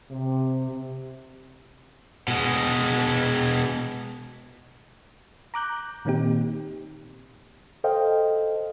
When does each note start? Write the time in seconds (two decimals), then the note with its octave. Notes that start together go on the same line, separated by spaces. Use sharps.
0.11 C3
2.28 B2 G#3
5.54 A#5 D6 F#6 G6
6.05 A#2 D#3 A#3 C4 D#4 G4
7.84 A4 C5 D#5 F5 G5